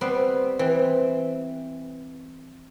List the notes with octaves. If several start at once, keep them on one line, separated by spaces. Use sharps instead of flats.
G3 B3 C4 B4 C6
E3 C4